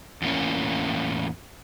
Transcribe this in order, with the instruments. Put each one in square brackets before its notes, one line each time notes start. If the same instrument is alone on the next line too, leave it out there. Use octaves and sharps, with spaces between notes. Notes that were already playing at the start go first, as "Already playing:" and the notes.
[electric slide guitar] E2 A2 A#3 C#4